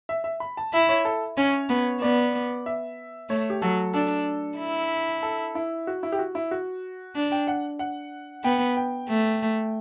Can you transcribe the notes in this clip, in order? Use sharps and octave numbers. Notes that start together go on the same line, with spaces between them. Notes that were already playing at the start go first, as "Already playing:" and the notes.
E5
E5
B5
A5
E4 E5
C#5
A4
C#4 C#5
B3
B3 D5
E5
A3 C#5
G4
F#3 A4
D4 A4
E4
A4
E4
F#4
E4
G4
F#4
E4
F#4
D4
G5
F#5
F#5
B3 G5
G5
A3